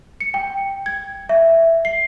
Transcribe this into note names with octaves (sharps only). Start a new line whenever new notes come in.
C#7
G5
G#6
E5
C7